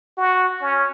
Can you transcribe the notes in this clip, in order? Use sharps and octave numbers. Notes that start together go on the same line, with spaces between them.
F#4
C#4